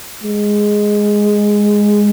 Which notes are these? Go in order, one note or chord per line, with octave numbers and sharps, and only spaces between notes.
G#3